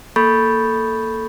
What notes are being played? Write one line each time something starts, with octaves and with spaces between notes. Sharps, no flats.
A#3 A4 B5 C#6 G6 A6